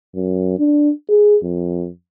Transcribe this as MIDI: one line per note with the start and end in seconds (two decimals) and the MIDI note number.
0.15 0.55 42
0.59 0.90 62
1.09 1.37 68
1.42 1.89 41